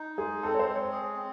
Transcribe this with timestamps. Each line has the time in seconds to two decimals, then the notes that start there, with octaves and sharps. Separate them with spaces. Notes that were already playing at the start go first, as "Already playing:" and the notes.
Already playing: D#4
0.18 G#3 G#4
0.43 C4 A4
0.54 C#5
0.59 C5
0.68 G#3
0.76 C#5
0.92 G#4
1.17 C4